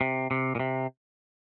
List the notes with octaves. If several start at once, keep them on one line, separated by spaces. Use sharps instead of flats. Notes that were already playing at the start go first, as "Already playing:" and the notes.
C3
C3
A#2
C3